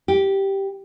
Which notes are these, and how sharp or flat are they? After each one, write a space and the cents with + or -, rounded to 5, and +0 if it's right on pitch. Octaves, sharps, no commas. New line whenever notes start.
G4 -5